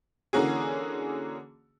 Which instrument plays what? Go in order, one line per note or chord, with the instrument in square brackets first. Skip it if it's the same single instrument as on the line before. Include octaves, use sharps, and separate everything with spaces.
[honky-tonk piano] D3 E3 A#3 C#4 F#4 G#4